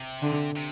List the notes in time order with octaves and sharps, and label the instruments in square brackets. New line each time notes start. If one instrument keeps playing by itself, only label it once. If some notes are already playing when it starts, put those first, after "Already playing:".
Already playing: [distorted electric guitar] C3
[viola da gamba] D3
[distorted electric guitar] C3